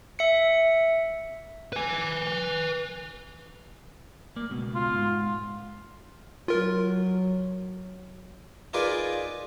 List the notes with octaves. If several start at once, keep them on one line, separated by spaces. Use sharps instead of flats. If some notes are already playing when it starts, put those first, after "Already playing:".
E5 C#7
B4 G#5
A#3 D5
C#2 B2
F4
G#2
F#3 F4 A#4
D#4 F4 G#4 A#4 B4 D5